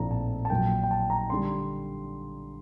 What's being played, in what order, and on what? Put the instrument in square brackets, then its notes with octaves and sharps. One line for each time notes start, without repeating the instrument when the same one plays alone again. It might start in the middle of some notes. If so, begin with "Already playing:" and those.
Already playing: [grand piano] A#1 A2 A3 C4 A#5
A5
A5
A#1 A#2 F#3 A#3 G5
G5
A5
A#5
D3 G3 C6